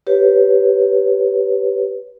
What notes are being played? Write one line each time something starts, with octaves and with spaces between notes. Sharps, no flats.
G4 B4 C#5